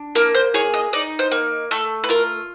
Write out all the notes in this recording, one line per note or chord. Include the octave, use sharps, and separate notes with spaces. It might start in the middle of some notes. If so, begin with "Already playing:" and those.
Already playing: D4
A#3 A#4
C5
G#4 C#5
D#5
D#4 D5
C5
A#3
A3 A4
B4
F4 A#4